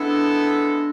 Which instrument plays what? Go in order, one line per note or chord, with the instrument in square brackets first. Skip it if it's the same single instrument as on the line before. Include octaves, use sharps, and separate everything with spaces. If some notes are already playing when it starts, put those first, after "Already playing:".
Already playing: [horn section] G#3 B3 E4 A4 [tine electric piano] D4